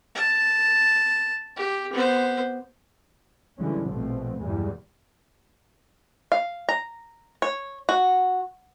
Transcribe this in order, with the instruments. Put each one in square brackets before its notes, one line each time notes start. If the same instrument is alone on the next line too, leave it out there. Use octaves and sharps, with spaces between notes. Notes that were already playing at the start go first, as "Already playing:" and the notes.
[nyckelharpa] A5
G4
B3 C5
[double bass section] A#2 D3 E3 G3 G#3 C#4
A#1 B2 F3 A3 C4
E2 G2 A#2 E3 G3 G#3
[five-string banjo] F5
A#5
C#5
F#4